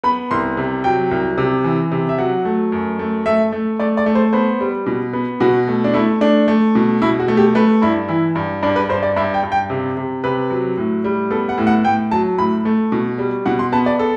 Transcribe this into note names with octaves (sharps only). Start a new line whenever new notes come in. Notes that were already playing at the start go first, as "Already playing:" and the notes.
B3 B5
C2 C6
C3
F#3 G5
C2
C3
E3
C3
E5
F#3 F#5
A3
F#2
A3
A3 E5
A3
A3 D5
D5
A3
C5
B3 C5
G3
B2
B3
B2 F#4
A3
D4
A3 E4
A3 D4
A3
B2
B2 E4
F#4
A3
G4
A3 B4
G2 E4
E3 E4
G2
G2 D4
B4
G2 C5
D5
G2 E5
G5
G2
G5
C3
C3
C3 B4
F#3
A2
G3
B3 A4
F#5
A2
F#5
A2 G5
F#3 A5
A2 B5
A3
B2
G3
B2 F#5
C6
B3 A5
D5
A4